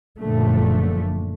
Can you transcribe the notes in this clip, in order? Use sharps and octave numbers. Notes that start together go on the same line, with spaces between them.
F#1 A#2 D3 F3 A3